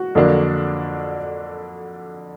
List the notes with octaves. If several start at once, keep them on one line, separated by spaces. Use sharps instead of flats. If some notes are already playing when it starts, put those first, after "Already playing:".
Already playing: F#4
F2 D3 F#3 A#3 D4